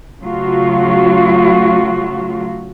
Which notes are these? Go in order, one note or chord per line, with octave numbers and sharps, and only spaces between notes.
C#3 F#3 A3 F4 F#4